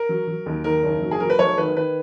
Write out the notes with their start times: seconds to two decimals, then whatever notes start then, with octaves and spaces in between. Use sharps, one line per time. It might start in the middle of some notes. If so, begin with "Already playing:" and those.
Already playing: A#4
0.09 F#3
0.27 F#3
0.46 D#2
0.64 D#3 A#4
0.83 F#1
1.02 F#3
1.11 G#4
1.20 F#3 A#4
1.30 B4
1.39 F1 C#5
1.57 D#3 B4
1.76 D#3 B4